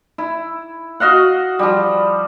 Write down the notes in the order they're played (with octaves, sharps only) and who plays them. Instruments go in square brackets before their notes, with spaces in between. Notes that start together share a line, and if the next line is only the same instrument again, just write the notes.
[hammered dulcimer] E4
F#4 D#5 F5 F#5
F3 G3